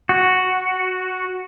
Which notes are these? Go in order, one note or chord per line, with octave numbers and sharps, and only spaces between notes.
F#4